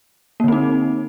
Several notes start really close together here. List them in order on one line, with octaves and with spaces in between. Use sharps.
A#3 D3 C4 D#4